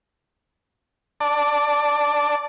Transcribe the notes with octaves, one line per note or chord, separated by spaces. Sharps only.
D5 A5